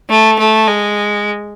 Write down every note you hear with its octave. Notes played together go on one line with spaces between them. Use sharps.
A3
A3
G#3